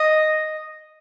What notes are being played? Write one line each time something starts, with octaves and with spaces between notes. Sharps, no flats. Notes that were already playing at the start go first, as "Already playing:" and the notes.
Already playing: D#5